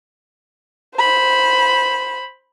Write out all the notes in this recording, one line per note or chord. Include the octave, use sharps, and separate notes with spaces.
C5 B5